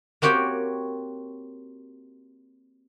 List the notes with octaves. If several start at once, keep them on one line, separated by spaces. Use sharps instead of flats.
A#3 C4 F#4 G4 C#5 G5